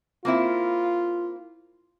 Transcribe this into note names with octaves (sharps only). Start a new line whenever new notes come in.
A#3 C4 E4 F4